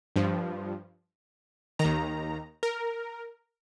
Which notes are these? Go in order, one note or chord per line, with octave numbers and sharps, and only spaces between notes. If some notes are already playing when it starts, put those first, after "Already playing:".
G2 F3
D#3 A#5
D#2
A#4